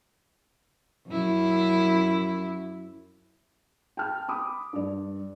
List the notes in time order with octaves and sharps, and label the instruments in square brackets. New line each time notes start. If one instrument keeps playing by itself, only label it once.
[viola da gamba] F#2 E4
[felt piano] G5 A5 F6
B5 D6 D#6
G2 D5